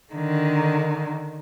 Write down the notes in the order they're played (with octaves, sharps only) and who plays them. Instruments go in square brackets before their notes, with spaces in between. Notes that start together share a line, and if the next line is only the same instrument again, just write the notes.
[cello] D3 D#3